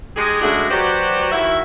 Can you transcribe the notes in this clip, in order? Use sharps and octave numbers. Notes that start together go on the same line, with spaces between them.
G#3 D#4 G4 G#4
C#3 G#3 A3 D4 F#4
F#3 F#4 G4 B4 C5 D5
D#3 E4 F#4 E5